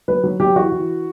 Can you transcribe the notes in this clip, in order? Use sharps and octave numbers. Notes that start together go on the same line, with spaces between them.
F#3 B4
F#3
F#3 G4
E3 F#4
E3